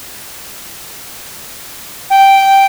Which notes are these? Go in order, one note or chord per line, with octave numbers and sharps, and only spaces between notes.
G5